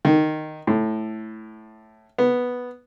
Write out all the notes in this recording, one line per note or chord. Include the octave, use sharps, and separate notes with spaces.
D#3
A2
B3